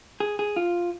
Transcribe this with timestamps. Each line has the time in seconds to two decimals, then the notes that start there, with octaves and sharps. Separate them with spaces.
0.20 G#4
0.39 G#4
0.56 F4